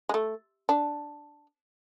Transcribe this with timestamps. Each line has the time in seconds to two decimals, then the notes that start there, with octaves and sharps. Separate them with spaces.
0.09 G#3
0.14 A3
0.69 D4